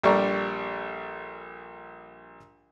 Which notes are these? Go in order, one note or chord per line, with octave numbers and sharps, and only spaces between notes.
A#1 G3 A4 D5 A#5 C#6